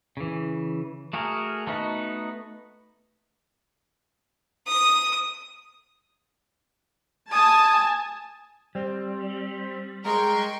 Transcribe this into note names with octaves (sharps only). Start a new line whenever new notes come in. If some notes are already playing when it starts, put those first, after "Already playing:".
C#3 E3
A3 F#4 G#4 A#4
A3 B3 D#4 F#4 B4
D#6
G#5 A5 D#6
G3 C4
G#3 A#4 G5 C6 C#6